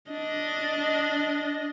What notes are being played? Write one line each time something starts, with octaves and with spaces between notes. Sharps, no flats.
D4 D#5